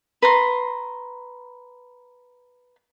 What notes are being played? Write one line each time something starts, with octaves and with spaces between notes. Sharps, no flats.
B4 A#5 C6